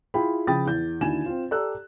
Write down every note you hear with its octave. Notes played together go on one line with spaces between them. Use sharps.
E4 F4 G#4 G5 B5
C#3 F3 G5 B5 D#6 A6
E2 G6
D#2 D3 E4 F#4 G#5 E7
C4 F4
G4 A4 D5 A#5 E6 F#6